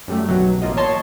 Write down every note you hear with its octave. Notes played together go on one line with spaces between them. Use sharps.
F#2 G3 A3
B1 B2 F#3
A1 A#3 F4 D#5
C#5 D#5 A5 C6